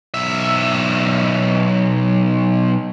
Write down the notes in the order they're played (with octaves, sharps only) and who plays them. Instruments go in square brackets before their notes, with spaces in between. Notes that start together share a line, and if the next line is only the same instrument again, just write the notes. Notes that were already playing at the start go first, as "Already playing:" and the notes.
[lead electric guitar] B1 E5